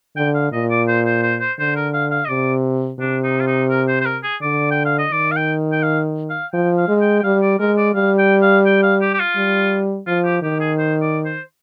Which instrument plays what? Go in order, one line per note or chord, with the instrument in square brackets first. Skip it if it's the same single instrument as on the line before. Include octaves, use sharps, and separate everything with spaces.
[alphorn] D3 [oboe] G5
[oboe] F5
[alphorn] A#2 [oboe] D#5
[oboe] D5
C5
C5
C5
C5
[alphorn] D3 [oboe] C5
[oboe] A#4
F5
F5
D#5
[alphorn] C3 [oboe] D5
[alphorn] C3 [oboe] D4
[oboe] D#4
F4
D#4
A#4
C5
C5
A#4
G#4
[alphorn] D3 [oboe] D5
[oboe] G5
F5
D#5
[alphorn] D#3 [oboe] D5
[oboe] F5
G5
G5
F5
F5
[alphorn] F3 [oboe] G5
[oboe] F5
[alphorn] G#3
[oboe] G5
G5
[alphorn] G3 [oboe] F5
[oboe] D5
[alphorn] G#3 [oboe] A#4
[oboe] D5
[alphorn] G3 [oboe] F5
[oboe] G5
F5
G5
F5
G4
G4
F4
[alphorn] G3
[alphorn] F3 [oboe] F4
[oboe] G4
[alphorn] D#3 [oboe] G4
[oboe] G#4
C5
D5
C5